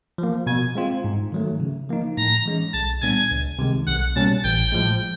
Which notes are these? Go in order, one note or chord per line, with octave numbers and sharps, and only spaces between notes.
F3 A#3
B2 G#5
G#3 C4 F4
G#2
D#3 F#3 A3
C#3
F3 A#3 D#4
A2 A#5
E3 G#3 C#4
B1 A5
A#2 G3 B3 D4 G#5
C#2
C3 D#3 G#3
B1 F#5
B2 G3 A#3 C#4 A5
A1 G5
A2 F3 G#3